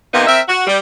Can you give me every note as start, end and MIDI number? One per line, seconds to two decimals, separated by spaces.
0.13 0.27 48
0.13 0.27 51
0.13 0.27 58
0.13 0.27 59
0.13 0.27 63
0.27 0.40 60
0.27 0.40 70
0.27 0.40 76
0.48 0.65 66
0.67 0.79 55